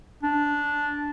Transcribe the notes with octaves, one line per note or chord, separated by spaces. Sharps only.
D4